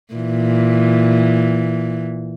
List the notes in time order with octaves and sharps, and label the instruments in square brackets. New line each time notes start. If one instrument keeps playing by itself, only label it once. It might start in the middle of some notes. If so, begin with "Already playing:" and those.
[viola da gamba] A#2 E3